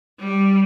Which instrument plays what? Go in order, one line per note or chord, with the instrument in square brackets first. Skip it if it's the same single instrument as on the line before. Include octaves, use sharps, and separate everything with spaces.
[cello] G3